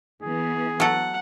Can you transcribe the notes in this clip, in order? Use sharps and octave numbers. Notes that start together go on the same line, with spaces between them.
E3 B3 G#4
F#3 A4 F#5